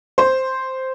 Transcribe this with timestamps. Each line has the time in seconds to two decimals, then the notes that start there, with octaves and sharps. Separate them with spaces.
0.18 C5